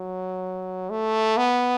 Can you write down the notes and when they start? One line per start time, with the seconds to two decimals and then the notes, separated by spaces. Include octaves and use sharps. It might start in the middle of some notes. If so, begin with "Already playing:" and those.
Already playing: F#3
0.90 A3
1.37 B3